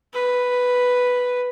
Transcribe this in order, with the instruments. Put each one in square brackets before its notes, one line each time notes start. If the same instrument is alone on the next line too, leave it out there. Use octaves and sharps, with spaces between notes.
[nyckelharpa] B4